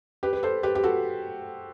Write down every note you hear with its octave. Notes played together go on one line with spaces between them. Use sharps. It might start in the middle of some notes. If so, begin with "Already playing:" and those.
G4 B4
B4
A4 C5
G4 B4
G4
F#4 A4